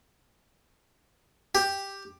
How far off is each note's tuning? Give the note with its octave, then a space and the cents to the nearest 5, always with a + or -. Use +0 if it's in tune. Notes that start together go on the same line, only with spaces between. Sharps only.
G4 +5